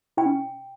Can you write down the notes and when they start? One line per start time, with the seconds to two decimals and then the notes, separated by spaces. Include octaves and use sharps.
0.17 E4 G5
0.26 C#4